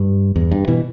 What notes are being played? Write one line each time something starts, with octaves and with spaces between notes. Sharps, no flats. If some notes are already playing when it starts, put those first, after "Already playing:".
Already playing: G2
E2
G2
B2 E3